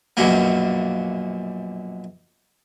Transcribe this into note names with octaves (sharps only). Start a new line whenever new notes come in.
A#1 F#2 B2 A#3